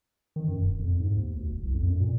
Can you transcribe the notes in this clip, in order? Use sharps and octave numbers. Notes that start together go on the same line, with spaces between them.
D#3
F#2
E1
F2
G#2
D#2
D2
F1
C2
F2
F#2
A#2